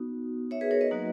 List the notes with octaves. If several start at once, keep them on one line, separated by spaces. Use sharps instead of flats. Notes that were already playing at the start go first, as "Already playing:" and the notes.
Already playing: B3 D#4 F#4
C#5 E5
G#4 B4
A#4 C#5
B4 D#5
F#3 A#3 D#4 F#4